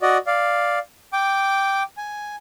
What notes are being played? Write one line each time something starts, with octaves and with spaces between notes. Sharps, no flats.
F#4 D5 D#5
D5 F5
G5 D6
G#5